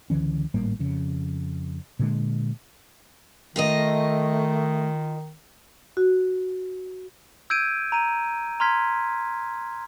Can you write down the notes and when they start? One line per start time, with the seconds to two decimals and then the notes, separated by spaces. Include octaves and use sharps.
0.10 C#2 D3 E3 C#4
0.54 G#1 A2 G3 A#3
0.79 F2 C#3
1.99 A#2 D3 G#3
3.56 D#3 A3 F4 A#4 D#5
5.97 F#4
7.50 E6 G6 G#6 D7 D#7
7.92 A#5 D#7
8.60 A#5 C6 F6 G#6 B6